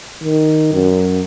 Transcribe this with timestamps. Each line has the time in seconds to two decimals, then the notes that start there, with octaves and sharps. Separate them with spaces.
0.24 D#3
0.73 F#2